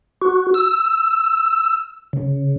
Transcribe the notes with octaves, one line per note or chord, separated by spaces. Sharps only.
F#4
E6
C#3